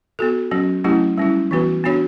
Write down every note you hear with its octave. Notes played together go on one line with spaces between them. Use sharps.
B3 F#4 A4
F#3 C#4 F#4
F#3 A3 C#4 E4 G4
G3 C#4 E4
E3 B3 F#4 B4
B3 D4 F#4 C#5